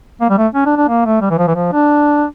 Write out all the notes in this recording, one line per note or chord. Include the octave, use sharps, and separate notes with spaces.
A#3
G3
A3
C#4
D4
D4
A#3
A3
G3
E3
F3
E3
F3
D4